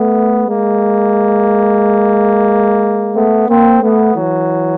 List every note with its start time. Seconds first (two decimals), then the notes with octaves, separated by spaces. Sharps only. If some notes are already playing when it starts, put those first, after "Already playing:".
Already playing: A3 B3
0.48 G#3 A#3
3.16 A3 B3
3.49 A#3 C4
3.82 A3 B3
4.16 E3 F#3